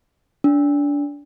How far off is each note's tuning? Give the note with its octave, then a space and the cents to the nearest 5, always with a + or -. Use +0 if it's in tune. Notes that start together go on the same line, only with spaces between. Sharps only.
D4 -25